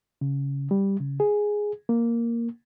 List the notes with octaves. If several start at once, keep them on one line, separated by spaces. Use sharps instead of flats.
C#3
G3
C#3
G#4
A#3